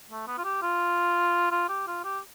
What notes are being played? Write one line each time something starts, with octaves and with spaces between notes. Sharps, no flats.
A3
B3
F4
G4
F4
F4
G4
F4
G4